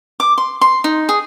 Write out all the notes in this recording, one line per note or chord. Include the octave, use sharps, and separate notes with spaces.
D6
C6
C6
D#4
G#4